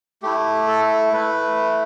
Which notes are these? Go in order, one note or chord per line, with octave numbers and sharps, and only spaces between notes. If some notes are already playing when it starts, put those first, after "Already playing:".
A3 E4 G4
A4
A3 E4 B4